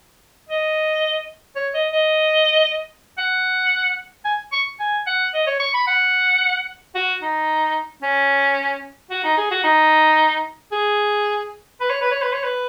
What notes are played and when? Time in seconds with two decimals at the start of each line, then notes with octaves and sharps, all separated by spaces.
0.49 D#5
1.56 C#5
1.74 D#5
1.92 D#5
3.18 F#5
4.25 G#5
4.52 C#6
4.80 G#5
5.07 F#5
5.34 D#5
5.47 C#5
5.60 C#6
5.74 B5
5.87 F#5
6.95 F#4
7.22 D#4
8.02 C#4
9.10 F#4
9.24 D#4
9.37 G#4
9.51 F#4
9.64 D#4
10.72 G#4
11.80 B4
11.90 C#5
12.01 B4
12.11 C#5
12.22 B4
12.33 C#5
12.44 B4